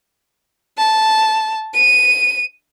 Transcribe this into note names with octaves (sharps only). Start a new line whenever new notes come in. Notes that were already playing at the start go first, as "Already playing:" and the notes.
A5
D#7